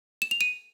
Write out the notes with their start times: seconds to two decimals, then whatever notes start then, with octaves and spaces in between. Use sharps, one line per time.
0.22 E7
0.31 F7
0.41 D#7